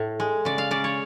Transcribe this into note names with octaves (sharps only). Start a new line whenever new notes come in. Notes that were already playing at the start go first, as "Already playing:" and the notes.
Already playing: A2
G#3
C#3 D5
F5
C#3 D5
C#5